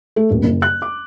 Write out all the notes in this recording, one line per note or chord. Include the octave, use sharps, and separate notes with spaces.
A3
D#1
F#1
F#6
D6